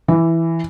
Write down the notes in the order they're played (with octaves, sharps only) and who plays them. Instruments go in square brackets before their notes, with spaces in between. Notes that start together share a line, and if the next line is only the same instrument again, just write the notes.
[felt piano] E3